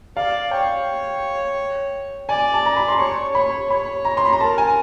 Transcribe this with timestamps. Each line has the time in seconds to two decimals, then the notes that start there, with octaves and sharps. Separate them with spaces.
0.16 D5 F5
0.51 C#5 G5
2.29 D5 G#5
2.54 A5
2.66 A#5
2.76 B5
2.88 C6
2.99 C#5 C#6
3.35 C#5 B5
3.70 C#5 B5
4.05 A#5
4.17 C6
4.25 B5
4.33 A#5
4.40 A#4 A5
4.58 G#5